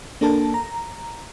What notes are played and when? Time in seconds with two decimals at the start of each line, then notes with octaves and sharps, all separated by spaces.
0.21 A#3 D4 A4 A#4 A5
0.54 A#5